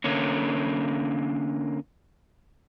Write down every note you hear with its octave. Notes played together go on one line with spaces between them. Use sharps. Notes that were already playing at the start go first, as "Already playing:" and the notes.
D3 A#3 C#4